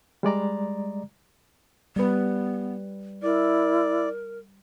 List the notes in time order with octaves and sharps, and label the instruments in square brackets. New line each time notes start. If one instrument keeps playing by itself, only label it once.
[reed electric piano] G3 G#3 D5 A#5
[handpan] G3 B4 [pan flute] B3
[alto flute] E4 [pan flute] A#4 [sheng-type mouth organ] D5